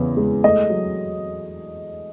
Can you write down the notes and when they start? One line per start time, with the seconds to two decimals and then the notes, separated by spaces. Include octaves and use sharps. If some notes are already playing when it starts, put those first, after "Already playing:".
Already playing: E2 C#3 B3
0.17 G#3
0.44 A3 D#5
0.70 F#3